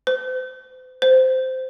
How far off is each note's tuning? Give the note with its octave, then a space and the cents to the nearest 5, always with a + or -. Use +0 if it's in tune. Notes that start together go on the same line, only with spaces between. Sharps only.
C5 -40
C5 -10